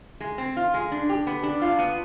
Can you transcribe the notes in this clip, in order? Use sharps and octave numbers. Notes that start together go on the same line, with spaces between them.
G#3
C4
F4
G#3
D4
G4
B3
D4
F4
B3